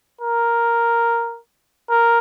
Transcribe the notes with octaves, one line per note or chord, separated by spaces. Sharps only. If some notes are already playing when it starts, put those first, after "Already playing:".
A#4
A#4